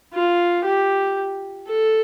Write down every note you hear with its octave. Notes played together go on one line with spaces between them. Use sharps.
F4
G4
A4